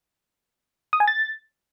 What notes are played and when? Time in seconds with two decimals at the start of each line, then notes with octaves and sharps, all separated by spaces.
0.93 D#6
1.00 G#5
1.08 A6